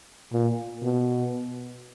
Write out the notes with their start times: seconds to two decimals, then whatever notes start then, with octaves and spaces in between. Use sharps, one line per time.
0.32 A#2
0.83 B2